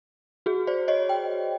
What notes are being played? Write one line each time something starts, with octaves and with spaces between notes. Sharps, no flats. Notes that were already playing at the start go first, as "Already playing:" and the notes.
F#4 G#4
C5 D5
C#5 D#5
G5